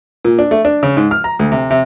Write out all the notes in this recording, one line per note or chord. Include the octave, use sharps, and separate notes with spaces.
A#2
D4
A3
D4
C#3
G#2
F6
A#5
D2
C3
C3